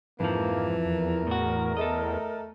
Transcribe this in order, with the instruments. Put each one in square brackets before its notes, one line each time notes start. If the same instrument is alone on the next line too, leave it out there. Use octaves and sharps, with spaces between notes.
[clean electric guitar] F2 F3 [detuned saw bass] G#2 [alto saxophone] E3 [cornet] A#3
[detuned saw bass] E2 [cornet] A#4
[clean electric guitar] A2 F#4
[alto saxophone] A3 [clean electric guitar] A4 D#5